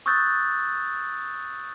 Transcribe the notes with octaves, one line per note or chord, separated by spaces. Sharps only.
C#6 D#6 E6 F#6 G6 A6